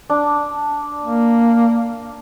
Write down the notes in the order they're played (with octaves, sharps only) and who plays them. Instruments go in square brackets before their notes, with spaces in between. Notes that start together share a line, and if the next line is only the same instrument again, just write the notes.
[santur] D4
[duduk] A#3